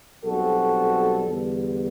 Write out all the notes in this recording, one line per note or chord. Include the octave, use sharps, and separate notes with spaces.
B1 B2 G3 C4 F#4 A4
E2 D3 G3